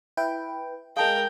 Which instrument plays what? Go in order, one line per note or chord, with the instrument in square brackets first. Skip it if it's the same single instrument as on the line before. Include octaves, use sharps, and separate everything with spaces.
[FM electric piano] E4 B4 G5
[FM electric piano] G#3 G#4 [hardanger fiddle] A#4 G5 [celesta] F5 A5